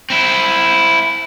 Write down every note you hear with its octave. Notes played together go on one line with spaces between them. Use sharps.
C4 E4